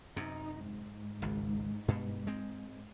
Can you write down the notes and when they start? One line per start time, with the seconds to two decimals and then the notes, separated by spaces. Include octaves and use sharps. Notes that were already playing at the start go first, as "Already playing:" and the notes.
0.16 F#2 C3 D#4
0.68 G#2
1.22 G#1 C#2
1.88 G2 B2
2.27 G#3 C4